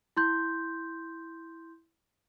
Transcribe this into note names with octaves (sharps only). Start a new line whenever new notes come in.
E4 C6 G6